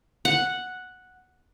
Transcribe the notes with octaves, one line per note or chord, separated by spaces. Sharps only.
F#5